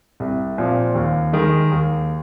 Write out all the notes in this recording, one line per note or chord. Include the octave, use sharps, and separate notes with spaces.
C2
A#2 F3 C4
D#2
D#3 G#3 D#4
D#2